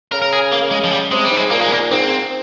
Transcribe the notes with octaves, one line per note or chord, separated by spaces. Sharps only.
C#3 A#4
A#4
G#4
A#3
G#3
F3
G3
C3 G#3
G3
G#2
G#3
A#2 A#3
G#3
A#2 A#3
G#2 C4